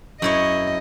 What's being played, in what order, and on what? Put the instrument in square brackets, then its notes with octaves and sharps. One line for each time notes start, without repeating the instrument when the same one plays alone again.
[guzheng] F#2 E4 C#5 [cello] D#5